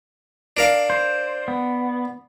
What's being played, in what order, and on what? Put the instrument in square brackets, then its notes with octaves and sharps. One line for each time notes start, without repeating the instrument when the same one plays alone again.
[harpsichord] D4 A#4 F5
[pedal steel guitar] C5
B3